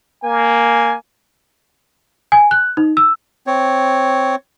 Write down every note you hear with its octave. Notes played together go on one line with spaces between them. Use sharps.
A#3 G#5
G#5
F#6
D#4
E6
C4 C#5